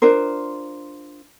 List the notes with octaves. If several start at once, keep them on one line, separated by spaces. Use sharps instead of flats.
D4 F4 A#4 C5